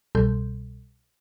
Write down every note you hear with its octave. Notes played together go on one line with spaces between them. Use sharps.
C2 B2 G3 A4 C6 G6